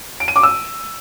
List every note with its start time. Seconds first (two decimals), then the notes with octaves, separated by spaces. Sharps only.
0.20 D7
0.28 D#7
0.36 D6
0.43 E6